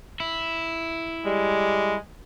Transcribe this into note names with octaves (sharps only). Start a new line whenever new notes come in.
E4
G3 G#3